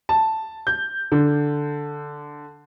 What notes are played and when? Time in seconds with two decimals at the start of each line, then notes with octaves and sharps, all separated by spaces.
0.09 A5
0.67 G6
1.12 D3